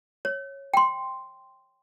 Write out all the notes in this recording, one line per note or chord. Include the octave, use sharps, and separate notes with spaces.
C#5
G5 C6